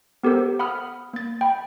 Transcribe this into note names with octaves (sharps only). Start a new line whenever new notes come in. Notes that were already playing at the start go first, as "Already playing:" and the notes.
B3 G4 A4 A#4 C5
F#5 B5 D#6 F6
A#3 A6
G5 B5